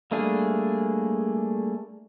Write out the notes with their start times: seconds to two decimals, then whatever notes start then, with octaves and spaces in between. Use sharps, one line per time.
0.11 G3 A3 A#3 D4 G#4